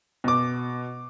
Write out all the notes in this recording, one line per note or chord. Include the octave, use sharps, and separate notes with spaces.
B2 D6